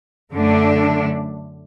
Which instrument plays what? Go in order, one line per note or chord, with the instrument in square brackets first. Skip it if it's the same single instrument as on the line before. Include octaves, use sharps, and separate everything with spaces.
[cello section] F#2 D3 A3 D4